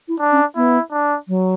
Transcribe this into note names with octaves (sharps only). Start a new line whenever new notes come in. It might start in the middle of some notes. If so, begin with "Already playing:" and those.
E4
D4
C#4
B3 E4
D4
F#3